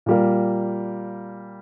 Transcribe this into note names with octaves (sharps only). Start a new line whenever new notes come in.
A#2 G3 A#3